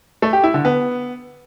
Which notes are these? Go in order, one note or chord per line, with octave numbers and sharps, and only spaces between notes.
A3
G4
E4
D3
B3